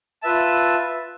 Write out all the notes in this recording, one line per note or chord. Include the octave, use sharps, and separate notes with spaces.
F4 B4 E5 A5